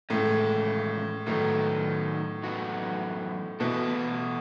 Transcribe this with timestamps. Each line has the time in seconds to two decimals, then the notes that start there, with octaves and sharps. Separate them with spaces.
0.10 A2 E3 G#3 C#4
1.27 A2 D#3 F#3 B3 D#4
2.43 F#2 E3 B3 D#4 F#4
3.60 B2 E3 B3 E4 A4